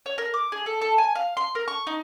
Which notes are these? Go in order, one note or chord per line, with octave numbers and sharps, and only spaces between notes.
C#5
A#4
D6
G#4
A4
A4
G#5
F5
C6
A#4
C#6
D#4